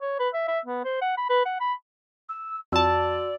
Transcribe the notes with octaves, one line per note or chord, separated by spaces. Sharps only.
C#5
B4
E5
E5
B3
C5
F#5
B5
B4
F#5
B5
E6
F2 F#4 D5 A5 E6